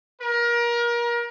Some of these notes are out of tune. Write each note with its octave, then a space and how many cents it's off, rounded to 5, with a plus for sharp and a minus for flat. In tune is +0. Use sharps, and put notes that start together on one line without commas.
A#4 +30